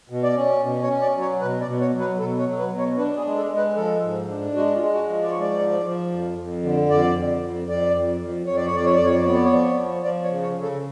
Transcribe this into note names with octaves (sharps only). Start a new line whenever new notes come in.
B2
D5
C#4
B2
C#5
C#4
D5
F#3
C#5
B2 B4
D5
B2
C#5
F#3
B4
B2 A4
C#5
F#3
B4
B2
C#5
D4 B4
G#4
G#3
A4
G#3
B4
F3 A4
G#2
D4
G#3 F#4
F4
G#3
F#4
F3
D5
G#2 C#5
D5
F3
F3
F2
F2
D3
F2 D5
F2
F2
F2 D5
F2
F2
F2 C#5
D5
C#5
F2 D5
C#5
F2 D5
C#5
D5
B3 C#5
D5
C#5
F3 D5
C#5
F3
F3 D5
C#5
C#3
C#5
C#3
A4